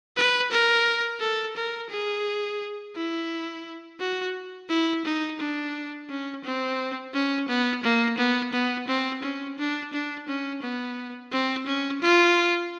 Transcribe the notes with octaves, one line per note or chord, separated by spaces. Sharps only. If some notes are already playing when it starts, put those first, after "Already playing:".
B4
A#4
A4
A#4
G#4
E4
F#4
E4
D#4
D4
C#4
C4
C#4
B3
A#3
B3
B3
C4
C#4
D4
D4
C#4
B3
C4
C#4
F4